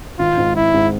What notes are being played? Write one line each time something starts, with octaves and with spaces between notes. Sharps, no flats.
G#1 F4
G#2 G#3 C4
G#1 E4
G#2 G#3 C4